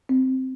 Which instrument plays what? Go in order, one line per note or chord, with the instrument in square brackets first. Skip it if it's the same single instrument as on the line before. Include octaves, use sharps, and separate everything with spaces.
[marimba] C4